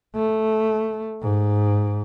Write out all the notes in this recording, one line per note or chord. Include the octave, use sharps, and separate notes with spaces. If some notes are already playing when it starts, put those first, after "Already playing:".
A3
G#2